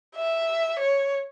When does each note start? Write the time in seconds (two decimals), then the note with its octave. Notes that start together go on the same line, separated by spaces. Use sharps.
0.16 E5
0.79 C#5